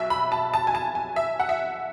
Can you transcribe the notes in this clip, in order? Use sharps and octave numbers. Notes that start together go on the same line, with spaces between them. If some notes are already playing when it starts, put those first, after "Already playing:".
Already playing: B1 B2 F#3 E5
B5
A5
A5
G#5
A5
G#5
E5
F#5
E5